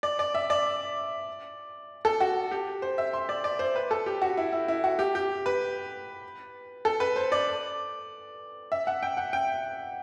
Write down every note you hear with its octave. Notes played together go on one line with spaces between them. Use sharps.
D5
D5
E5
D5
A4
F#4
G4
C5
E5
C6
D5
D5
C5
B4
A4
G4
F#4
E4
E4
E4
F#4
G4
G4
B4
A4
B4
C5
D5
E5
F#5
G5
F#5
G5